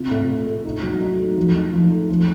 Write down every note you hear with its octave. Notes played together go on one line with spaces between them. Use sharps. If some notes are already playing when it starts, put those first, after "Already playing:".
Already playing: C3 F4
A2
A3
A3
D#4
F#3
D#4
A3
F3
D#4
F3
A3
F3